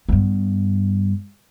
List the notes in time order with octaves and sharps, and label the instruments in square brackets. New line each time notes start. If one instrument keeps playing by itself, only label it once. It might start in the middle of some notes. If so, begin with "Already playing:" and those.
[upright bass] G2 B3